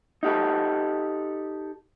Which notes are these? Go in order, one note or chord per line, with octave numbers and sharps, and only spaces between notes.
D#4 G4 A4